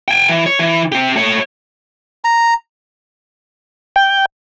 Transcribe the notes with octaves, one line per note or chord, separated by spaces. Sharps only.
G5 G#5
E3
C#5
E3
C4 G4
A3 C#5
A#5
G5